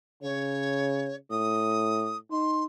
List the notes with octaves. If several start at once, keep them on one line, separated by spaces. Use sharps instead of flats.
C#3 C#5
A2 D#6
D#4 C6